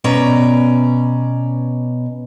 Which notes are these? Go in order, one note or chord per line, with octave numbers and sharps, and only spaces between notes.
B2 C#4 D5 A#5